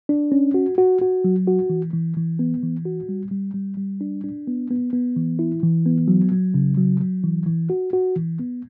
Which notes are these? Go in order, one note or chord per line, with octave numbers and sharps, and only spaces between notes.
D4
C#4
F#4
F#4
F#4
F#3
F#4
E3
E3
E3
B3
E3
F#4
G3
G3
G3
G3
D4
D4
B3
B3
B3
E3
E4
E3
B3
F#3
F#3
C#3
F#3
F#3
E3
E3
F#4
F#4
E3
B3